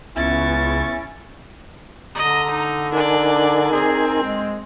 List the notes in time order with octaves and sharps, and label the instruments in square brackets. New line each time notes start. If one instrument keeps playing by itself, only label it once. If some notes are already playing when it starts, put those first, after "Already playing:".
[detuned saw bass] C#2 [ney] B3 [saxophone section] C#4 E4 [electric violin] C#6 A6
[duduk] D3 [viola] D#5 [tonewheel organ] A#5
[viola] D#4
[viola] D4 D5 [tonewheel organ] D#4 A#4 G#5
[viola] C4 [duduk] G#4
[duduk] G#3